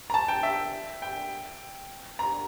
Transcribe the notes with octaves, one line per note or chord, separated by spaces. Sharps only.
A#5
A5
G5
E5
G5
A#5